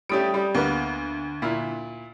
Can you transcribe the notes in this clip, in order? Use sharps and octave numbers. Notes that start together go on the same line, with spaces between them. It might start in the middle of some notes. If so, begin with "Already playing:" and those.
G3 A3 C#4 G4 D#6 D7
G3
D2 A#3 B3
A#2 E4